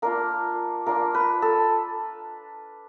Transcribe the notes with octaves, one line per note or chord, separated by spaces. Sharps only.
A#3 D4 F4 A#4
A#3 D4 F4 A#4
B4
A4